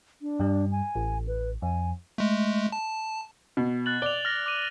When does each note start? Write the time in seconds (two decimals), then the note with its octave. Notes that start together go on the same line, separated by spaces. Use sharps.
0.22 D4
0.39 G2 G3
0.72 G#5
0.95 A1
1.27 B4
1.62 F2 G#5
2.18 G#3 A3
2.72 A5
3.57 B2
3.86 F#6 A6 F#7
4.02 D5 F7 G7
4.25 F6 A#6
4.46 D6 D#7